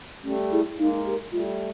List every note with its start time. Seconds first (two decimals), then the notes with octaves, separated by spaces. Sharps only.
0.23 G3 A3 C#4
0.51 E4 G#4
0.77 G#3 A#3 D#4
1.05 G4 A#4
1.32 G3 A3 F4